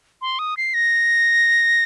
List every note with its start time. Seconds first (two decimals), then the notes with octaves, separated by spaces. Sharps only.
0.22 C6
0.39 D#6
0.57 C7
0.74 A#6